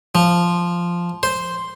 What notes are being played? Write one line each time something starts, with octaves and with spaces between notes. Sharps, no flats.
F3
C5